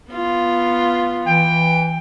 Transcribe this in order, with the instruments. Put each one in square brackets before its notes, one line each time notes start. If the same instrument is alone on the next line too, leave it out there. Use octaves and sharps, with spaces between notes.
[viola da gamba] B3 F4
[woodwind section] E3 G5